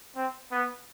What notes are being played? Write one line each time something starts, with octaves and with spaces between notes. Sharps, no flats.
C4
B3